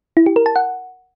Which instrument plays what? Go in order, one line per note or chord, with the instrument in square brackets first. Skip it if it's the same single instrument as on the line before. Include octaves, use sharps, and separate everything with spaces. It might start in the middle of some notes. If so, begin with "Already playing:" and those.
[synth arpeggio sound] E4
G4
A#4
A5
F#5